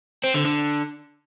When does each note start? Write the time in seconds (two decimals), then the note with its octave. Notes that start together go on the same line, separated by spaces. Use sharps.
0.24 C4
0.34 D3
0.45 D3